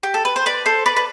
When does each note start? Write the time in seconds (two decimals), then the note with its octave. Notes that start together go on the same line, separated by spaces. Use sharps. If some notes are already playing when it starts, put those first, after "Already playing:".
0.03 G4
0.14 A4
0.25 B4
0.36 C5
0.46 B4 D5
0.66 A4 C5
0.86 B4 D5
0.96 B4